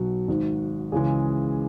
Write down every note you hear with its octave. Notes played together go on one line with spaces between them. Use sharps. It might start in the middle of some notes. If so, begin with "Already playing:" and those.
Already playing: B1 B2 F#3 F#4
G#1 G#2 D#3
C#2 C#3 E3 G#3 G#4